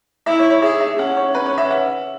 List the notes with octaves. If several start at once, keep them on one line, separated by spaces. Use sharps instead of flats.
E4 E5
C#5
C#5
G#4 E5
E5
C#4 F#5
C#5
C#4 B4
C#5
E5
F#5